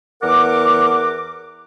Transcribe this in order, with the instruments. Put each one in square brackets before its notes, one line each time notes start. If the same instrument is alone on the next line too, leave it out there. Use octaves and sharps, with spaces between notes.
[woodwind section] E2 A#4 F#5 D6